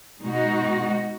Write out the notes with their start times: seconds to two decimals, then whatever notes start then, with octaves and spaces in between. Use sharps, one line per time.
0.22 B2 G#3 D#4 F#4